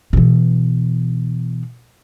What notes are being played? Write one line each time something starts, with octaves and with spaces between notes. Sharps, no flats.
B2 E3